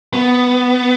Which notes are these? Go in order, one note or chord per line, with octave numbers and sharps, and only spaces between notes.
B3